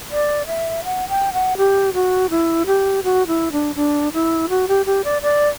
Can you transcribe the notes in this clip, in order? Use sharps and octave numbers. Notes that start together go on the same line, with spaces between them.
D5
E5
F#5
G5
F#5
G4
F#4
E4
G4
F#4
E4
D4
D4
E4
F#4
G4
G4
D5
D5